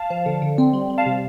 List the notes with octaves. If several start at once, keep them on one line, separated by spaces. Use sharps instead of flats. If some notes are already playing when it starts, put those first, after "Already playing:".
Already playing: F5 A5
F3
D3
D3
C4
G3
G3
F5 A5
C3